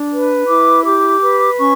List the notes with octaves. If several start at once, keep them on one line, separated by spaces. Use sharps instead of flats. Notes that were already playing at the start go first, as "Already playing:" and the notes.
Already playing: D4
B4
E4 D6
G4 D6
B4
C#4 C#6